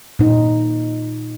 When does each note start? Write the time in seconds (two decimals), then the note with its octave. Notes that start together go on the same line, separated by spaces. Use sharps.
0.19 A#2 D#4